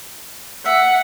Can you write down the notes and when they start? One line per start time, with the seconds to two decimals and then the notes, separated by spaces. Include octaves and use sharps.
0.66 E5 F#5